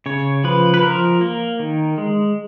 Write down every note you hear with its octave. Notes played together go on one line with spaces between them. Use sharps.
C#3 C#5
F3 B4
B4
F3 A#4
A#3
D#3
G#3